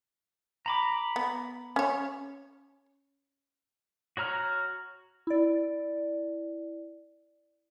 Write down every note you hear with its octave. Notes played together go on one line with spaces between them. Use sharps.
A#5 B5 D6
B3
C#4 C#5
F#4 C#5 A#5 F6
E4 D5